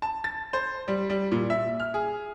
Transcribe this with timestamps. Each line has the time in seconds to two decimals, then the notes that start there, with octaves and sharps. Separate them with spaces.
0.02 A5
0.24 A6
0.53 C5
0.88 G3
1.10 G3
1.32 A#2
1.50 E5
1.80 F6
1.94 G#4